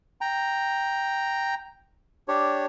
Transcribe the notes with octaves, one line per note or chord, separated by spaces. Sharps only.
G5 A#5
D4 G4 C#5